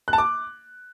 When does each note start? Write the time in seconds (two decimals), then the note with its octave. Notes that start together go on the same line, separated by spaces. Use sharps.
0.08 F#6
0.13 A5
0.18 D6